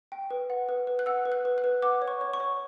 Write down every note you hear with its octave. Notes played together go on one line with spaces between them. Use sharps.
G5
B4
F#5
B4
B4
F#6
F#5 E6
B4
F#6
B4
F#6
B4
F#5 D6
C#5
C#6
C#5
C#6
C#5